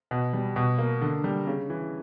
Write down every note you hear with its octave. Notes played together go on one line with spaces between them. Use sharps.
B2
G3
B2
A#3
D3
G3
C#3
E3